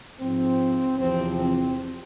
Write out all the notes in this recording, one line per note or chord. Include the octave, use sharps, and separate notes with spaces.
G#2 F3 C4
E2 C3 F3 C4
C4